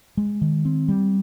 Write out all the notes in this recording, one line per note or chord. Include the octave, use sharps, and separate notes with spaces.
G#3
D#3
C4
G3